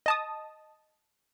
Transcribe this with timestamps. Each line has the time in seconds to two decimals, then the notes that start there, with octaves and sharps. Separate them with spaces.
0.06 D#5 A5 D#6